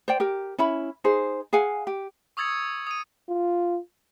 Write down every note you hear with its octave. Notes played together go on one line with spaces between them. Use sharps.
C5 D5 G5
G4 A#4
C#4 E4 B5
D#4 G#4 C5
G#4 F5 F#5 G#5
G4
C#6 D#6 E6 G#6 A6 C#7
D#6 D#7
F4